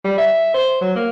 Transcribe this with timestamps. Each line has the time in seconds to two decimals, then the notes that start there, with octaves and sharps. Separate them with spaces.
0.04 G3
0.18 E5
0.54 C5
0.81 F#3
0.95 A#3